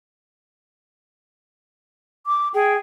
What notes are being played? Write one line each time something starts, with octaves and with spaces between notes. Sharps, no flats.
D6
G#4 G5